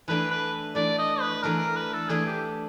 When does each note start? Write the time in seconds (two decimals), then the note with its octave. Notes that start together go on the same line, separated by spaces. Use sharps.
0.08 E3 A3 D4 B4
0.31 B4
0.75 E3 A3 D4 D5
0.98 D#5
1.21 B4
1.42 E3 A3 D4 A#4
1.59 A#4
1.76 B4
1.93 A4
2.09 E3 A3 D4 G#4
2.27 G4